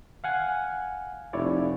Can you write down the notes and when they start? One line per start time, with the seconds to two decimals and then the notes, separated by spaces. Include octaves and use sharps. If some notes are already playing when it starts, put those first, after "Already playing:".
0.24 F5 F#5 G#5
1.33 F1 E4 C#5 D5